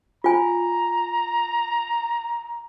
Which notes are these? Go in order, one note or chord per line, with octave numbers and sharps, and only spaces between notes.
F4 G#5 A#5